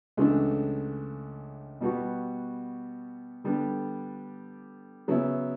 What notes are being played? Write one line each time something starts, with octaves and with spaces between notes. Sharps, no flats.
C#2 C#3 E3 A3 D4
B2 G3 B3 F#4
D3 G3 B3 D4 G4
C#3 F#3 B3 E4